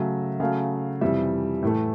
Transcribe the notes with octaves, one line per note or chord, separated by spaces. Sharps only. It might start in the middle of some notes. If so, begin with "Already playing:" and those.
Already playing: C#3 F#3 A3 E5
C#3 F#3 A3 F5
F2 C3 E3 G3 E5
A2 E3 A3